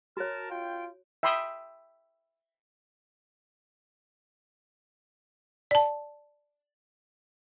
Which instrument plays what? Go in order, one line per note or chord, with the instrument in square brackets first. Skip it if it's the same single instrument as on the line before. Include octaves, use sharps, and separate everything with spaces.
[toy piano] F#4 C#5 [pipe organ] A#4 A5
[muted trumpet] F4 [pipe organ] G5
[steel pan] E5 G5 B5 C6 D#6
[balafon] D5 A5